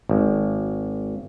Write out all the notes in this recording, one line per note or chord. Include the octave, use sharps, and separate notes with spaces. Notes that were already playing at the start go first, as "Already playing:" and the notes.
G#1